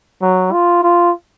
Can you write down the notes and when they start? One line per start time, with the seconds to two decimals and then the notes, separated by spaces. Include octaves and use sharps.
0.22 F#3
0.52 F4
0.83 F4